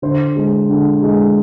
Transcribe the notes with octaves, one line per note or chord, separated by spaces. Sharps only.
D3 C5
G#3
D3
G#3